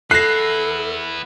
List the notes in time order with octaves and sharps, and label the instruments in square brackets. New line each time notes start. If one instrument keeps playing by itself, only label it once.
[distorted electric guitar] B3 E4 [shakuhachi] A4 [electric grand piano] F#6 A#6 [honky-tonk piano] C7